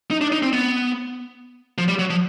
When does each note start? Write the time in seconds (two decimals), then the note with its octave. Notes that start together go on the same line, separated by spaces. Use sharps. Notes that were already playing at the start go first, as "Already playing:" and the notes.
0.11 D#4
0.21 D4
0.32 D#4
0.43 C4
0.53 B3
1.78 F3
1.88 G3
1.99 F#3
2.10 F3